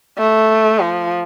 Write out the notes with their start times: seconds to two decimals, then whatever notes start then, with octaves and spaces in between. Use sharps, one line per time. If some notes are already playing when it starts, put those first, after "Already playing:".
0.18 A3
0.80 F3